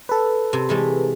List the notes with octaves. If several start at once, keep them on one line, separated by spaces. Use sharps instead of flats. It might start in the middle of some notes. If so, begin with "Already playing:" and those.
A4 B4
C3
E3 G#3 A3